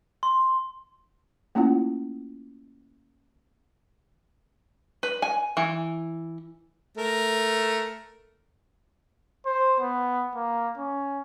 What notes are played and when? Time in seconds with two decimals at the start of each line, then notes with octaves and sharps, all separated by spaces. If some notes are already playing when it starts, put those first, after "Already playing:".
0.23 C6
1.55 A3 A#3 C#4 E4 F4 F#5
5.03 B4
5.22 G#5
5.57 E3
6.97 A3 A#4
9.46 C5
9.80 B3
10.35 A#3
10.77 C#4